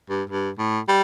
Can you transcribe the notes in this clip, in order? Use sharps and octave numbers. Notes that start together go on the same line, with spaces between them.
G2
G2
A2
G3